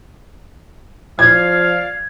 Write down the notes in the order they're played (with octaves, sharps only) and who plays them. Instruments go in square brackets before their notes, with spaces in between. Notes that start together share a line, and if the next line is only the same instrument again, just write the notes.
[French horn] F3 [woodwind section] D5 F5 [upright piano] G#6